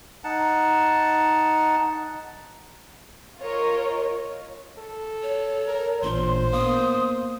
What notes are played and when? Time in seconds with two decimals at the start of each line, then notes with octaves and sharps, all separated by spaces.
0.24 D#4 F#5 A5
3.39 F4 A#4 C#5 D#5
4.78 A4
5.23 C#5
5.67 A#4
6.02 A1 A#2 D4 C5 C6
6.52 A#3 B3 F5 D#6